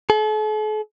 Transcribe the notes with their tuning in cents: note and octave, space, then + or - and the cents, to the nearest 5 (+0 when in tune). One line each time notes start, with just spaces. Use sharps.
A4 -45